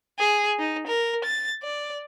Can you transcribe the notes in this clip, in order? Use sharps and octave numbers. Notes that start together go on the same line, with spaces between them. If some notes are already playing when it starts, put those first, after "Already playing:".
G#4
D#4
A#4
A6
D5